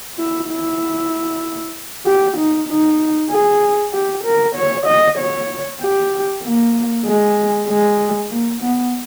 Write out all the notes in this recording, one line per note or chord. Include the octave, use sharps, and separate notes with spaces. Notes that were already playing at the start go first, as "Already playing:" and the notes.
E4
E4
G4
D#4
D#4
G#4
G4
A#4
C#5
D#5
C#5
G4
A#3
G#3
G#3
A#3
B3